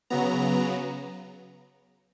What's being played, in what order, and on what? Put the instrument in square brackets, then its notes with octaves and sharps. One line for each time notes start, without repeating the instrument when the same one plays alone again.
[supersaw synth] C#3 F#3 B3 A#5